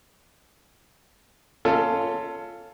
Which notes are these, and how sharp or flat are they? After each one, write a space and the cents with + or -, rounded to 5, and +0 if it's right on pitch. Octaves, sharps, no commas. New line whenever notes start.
C#4 +20 F4 -5 A4 +15